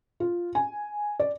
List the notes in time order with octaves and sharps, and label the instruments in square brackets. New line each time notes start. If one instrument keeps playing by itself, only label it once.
[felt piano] F4
G#5
D5